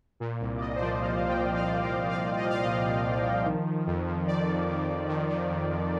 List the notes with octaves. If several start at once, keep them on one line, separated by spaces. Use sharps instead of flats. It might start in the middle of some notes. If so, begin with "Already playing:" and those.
A#2
C2
D5
C2 D#5
C5
F3 D5
A#2 F5
C2 F5
G5
C2
F5
F3
A#2 G5
C2
F5
C2
D#5
F3
F5
A#2 D#5
C2
C2
F3
D#3
D#3
F2
F2
D#3 D5
D#3
F2
F2
D#3
D#3
F2
F2